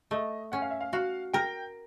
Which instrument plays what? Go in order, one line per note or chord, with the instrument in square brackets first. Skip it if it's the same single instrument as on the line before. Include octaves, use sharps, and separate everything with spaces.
[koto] A3 [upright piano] D#5
[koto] C#4 [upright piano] F#5
[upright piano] F5
E5
F5
[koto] F#4 [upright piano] F5
[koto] A#4 [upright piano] G5